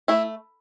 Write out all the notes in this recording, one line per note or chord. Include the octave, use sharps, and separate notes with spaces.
A3 E4